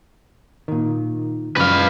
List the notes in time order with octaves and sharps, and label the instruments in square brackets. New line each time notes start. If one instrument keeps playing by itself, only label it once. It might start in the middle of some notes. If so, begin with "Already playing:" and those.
[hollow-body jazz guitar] A#2 D#3
[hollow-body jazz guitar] F#2 C#3 F3 [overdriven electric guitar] B4 F5